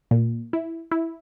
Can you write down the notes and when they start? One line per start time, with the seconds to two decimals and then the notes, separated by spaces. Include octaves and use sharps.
0.11 A#2
0.53 E4
0.91 E4